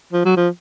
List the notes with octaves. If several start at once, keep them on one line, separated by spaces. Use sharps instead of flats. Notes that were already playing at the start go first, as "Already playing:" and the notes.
F3
F#3
F3